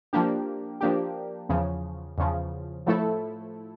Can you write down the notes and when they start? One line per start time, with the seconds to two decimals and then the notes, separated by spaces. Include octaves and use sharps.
0.13 F3 A#3 D4 G4
0.81 F3 A#3 D4 G4
1.49 E2 C#3 F3
2.18 E2 C#3 F3
2.86 A2 F3 A3 E4 A4